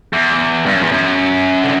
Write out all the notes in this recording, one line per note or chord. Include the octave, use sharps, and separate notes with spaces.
E2
G2
F#2
E2
F#2
D3